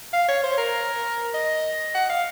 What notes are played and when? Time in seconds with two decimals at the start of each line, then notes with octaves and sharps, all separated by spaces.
0.13 F5
0.28 C#5
0.43 C5
0.58 A#4
1.34 D#5
1.95 F#5
2.10 F5